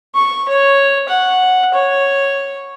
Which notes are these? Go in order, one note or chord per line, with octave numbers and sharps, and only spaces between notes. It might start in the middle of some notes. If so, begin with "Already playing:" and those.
C#6
C#5
F#5
C#5